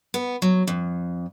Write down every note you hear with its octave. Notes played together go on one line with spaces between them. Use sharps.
B3
F#3
F2